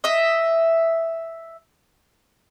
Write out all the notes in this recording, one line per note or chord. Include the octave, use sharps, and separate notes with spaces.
D#5 E5